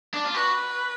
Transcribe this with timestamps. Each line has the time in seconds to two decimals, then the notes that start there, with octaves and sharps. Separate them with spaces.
0.14 D4
0.25 F4
0.34 F#4 B4